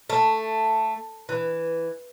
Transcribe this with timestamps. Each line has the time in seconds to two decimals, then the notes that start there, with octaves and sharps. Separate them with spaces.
0.10 A3
1.29 E3